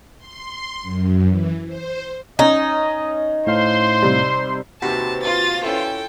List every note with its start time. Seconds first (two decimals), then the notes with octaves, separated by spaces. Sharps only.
0.17 C6
0.82 F#2
1.27 E3
1.66 C5
2.39 C#4 D#4 D#5
3.47 A2 C5 F5 C6
4.03 C3 G3
4.82 D#2 C3 F#4 B4 C5 A5
5.23 F4 A6 D#7
5.64 C#4 E4 A4 G5